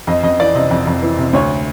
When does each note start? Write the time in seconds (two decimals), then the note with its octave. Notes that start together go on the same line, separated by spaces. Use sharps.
0.07 F2 D#5
0.23 F2 D#5
0.40 E3 D5
0.55 C3 D#5
0.71 F2
0.87 F2
1.03 E3
1.18 C3
1.33 D2 C#5